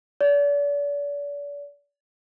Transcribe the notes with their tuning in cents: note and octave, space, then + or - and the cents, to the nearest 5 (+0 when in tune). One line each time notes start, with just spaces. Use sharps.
D5 -40